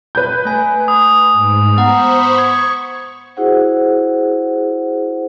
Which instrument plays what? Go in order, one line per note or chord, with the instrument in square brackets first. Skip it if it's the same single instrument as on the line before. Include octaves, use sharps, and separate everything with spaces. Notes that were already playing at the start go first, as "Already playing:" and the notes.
[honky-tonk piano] B4 G6
[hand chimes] A3 G#5
[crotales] D#6
[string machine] G#2
[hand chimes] B3 F#5 A#5 [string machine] C5 B5 C#6
[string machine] C#6 [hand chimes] G#6
[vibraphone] E4 F#4 G#4 C5 F#5